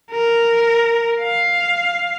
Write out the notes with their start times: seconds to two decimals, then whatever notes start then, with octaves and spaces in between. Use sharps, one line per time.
0.11 A#4
1.21 F5